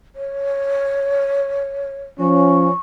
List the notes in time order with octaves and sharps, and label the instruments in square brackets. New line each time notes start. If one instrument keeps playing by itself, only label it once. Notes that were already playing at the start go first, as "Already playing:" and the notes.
[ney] C#5
[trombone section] F3 C#4 [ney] C#6